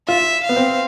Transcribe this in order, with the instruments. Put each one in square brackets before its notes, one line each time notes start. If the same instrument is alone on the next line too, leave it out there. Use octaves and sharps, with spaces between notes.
[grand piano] F4 [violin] E5
[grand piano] B3 [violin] F5
[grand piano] C4